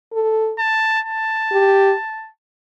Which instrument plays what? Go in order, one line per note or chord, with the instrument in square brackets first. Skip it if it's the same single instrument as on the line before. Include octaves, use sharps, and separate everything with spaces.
[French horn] A4
[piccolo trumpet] A5
A5
[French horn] G4